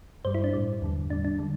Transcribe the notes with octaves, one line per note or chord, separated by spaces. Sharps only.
G2 G3 C5
E4
D4
A2 G3
E2 D3 G3
A2 G3 D4
D4
D3 G3